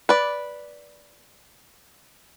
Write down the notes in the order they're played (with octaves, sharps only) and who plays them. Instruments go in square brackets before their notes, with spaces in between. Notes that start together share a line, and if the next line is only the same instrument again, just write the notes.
[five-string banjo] B4 D5